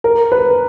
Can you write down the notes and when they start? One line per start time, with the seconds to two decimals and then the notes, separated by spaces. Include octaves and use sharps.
0.04 A#4
0.32 B4